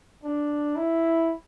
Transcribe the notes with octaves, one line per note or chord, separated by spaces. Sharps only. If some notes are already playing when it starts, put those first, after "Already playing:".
D4
E4